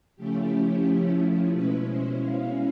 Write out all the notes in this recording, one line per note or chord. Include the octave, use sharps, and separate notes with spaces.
C#3 F3 A3 C#4 E4 G4
B2 G#3 C#4 E4 B4
C5
F5